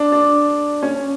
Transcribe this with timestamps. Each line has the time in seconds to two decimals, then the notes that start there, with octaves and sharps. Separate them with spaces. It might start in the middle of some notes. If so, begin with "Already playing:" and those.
Already playing: D4
0.12 D4
0.83 C#4